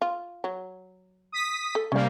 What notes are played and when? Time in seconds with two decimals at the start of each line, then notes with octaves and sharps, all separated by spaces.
0.02 F4
0.44 F#3
1.32 D#6 B6
1.75 A4
1.92 C3 G3 A#3 C#4 F5